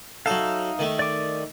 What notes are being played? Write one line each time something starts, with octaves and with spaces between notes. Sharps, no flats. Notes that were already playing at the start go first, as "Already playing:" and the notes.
F#3 D#4 A4 E5 F5
D#3 A3
D5 D6